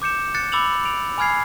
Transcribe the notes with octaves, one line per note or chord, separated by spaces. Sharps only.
D6 G6 C#7 E7
F#6 A6 C#7
B5 D6 E6 A6 F7 F#7
D7 F7
G#5 B5 F6 G#6 C7